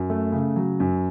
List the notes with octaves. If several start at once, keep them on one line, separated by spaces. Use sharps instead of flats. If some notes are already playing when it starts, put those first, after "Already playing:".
Already playing: F#2
A3
C#3
F#3
F#2